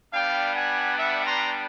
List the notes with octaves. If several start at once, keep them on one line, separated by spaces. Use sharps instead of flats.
G3 B3 D4 F5 G5
F#5 G#5
E5 F#5
A#5 C6